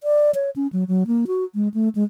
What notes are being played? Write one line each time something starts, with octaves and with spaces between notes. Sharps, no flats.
D5
C#5
C#4
F#3
F#3
A#3
F#4
G#3
A3
G#3